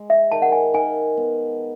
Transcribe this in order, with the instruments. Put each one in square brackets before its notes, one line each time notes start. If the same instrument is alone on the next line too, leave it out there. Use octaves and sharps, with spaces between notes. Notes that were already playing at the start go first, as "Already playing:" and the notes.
Already playing: [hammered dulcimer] G#3
[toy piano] E5
[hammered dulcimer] D#3 [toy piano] A5
[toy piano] F#5
G#5
[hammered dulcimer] D#3 [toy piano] G#5
[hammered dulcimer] B3